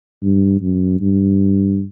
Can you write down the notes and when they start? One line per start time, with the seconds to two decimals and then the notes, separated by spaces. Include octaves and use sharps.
0.22 G2
0.61 F#2
1.01 G2